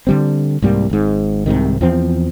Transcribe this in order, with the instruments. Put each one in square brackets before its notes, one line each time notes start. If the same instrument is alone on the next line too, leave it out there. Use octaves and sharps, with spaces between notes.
[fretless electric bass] D3 G3 C4
C2 G#2 G3 A#3
G#1 G#2
C2 G#2 C3 D#3
E2 F3 C4